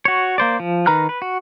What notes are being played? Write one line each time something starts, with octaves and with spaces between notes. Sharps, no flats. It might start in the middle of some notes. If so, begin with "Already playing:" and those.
F#4 C#5
A#3 C5 D5
F3
D#3 B4 A#5 F6 F#6
B4
F#4